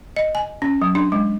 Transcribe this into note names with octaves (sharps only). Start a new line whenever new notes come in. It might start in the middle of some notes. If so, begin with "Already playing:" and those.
D#5
G#5
C#4
F#3
D4
G#3